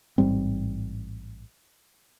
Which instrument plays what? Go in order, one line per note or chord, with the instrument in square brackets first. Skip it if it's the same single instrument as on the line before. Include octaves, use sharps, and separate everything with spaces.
[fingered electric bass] A1 G#2 G3 C4